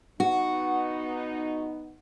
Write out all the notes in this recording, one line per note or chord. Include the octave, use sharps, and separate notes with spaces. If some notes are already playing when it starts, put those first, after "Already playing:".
B3 D#4 F#4